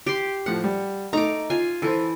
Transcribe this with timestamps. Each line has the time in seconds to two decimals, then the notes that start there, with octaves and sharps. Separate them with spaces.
0.07 G4 C6
0.46 A2 F3 F#5
0.64 G3
1.13 A3 D#4 A#5 D6
1.50 F4 G#5
1.82 E3 E4 A4 C5